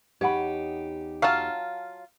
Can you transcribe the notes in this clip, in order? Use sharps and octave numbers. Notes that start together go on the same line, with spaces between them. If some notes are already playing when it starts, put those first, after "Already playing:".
E2 D#4 G4 C#5 F#5 B5
F#3 F4 F5 A5